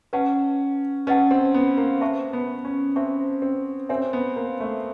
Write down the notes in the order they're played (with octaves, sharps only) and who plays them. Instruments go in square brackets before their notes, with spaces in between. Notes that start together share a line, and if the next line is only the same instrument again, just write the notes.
[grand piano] C#4 [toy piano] B4 D#5 F#5 A5
[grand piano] C#4 [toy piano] B4 D#5 F#5 A5
[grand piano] C4
B3
A#3
[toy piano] C5 E5 A5 C#6
[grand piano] B3
C#4
[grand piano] C4 [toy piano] C5 E5 A5 C#6
[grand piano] C4
[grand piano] C4 [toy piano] F#4 A#4 C#5 E5 G#5
[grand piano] B3
A#3
A3